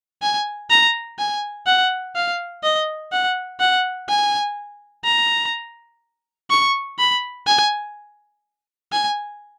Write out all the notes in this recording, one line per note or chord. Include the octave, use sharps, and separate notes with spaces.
G#5
A#5
G#5
F#5
F5
D#5
F#5
F#5
G#5
A#5
C#6
B5
G#5
G#5